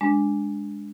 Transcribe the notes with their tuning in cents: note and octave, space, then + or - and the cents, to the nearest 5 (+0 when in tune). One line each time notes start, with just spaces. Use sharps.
G#3 -5 D4 -5